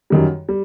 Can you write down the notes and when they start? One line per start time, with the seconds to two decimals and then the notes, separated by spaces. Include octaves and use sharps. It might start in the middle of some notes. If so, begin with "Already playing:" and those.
0.10 F#2 D#3 G3
0.49 G3